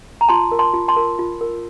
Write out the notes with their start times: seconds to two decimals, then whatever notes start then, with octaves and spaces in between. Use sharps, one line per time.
0.21 A#5
0.29 F4 A5 C6
0.52 A#4
0.59 A5 C6
0.74 F4
0.88 A5 C6
0.97 A#4
1.19 F4
1.41 A#4